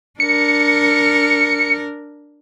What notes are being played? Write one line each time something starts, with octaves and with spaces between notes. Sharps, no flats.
D4 A#4 C#7